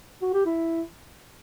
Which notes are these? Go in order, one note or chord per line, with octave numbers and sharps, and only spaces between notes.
F#4
G4
E4